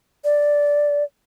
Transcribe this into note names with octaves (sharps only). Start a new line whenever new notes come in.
D5